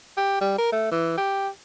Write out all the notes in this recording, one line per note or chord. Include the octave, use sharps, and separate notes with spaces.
G4
G3
A#4
A3
E3
G4